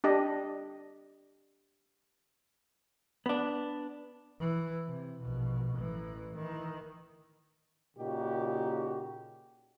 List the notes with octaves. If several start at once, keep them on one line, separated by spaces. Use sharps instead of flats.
D4 G4 D#5
B3 D4
E3
C3
A#1 B2
A1 E3
D#3 E3
A#2 C#3 D#4 F#4 G4